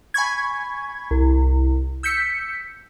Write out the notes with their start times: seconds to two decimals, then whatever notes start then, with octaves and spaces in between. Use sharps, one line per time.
0.14 G#5 B5 C#6 G#6
1.11 C2
2.03 E6 G6 B6 C#7